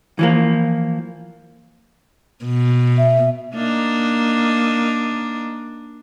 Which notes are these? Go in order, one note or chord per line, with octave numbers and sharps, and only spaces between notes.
E3 F3 A#3
B2
E5
A#3 D4 D#4